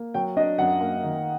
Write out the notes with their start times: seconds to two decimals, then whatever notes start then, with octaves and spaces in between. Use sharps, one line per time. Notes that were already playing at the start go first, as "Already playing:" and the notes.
Already playing: A#3
0.14 F#3 G5
0.37 D4 D#5
0.58 F#2 F#5
0.81 A#3
1.03 D#3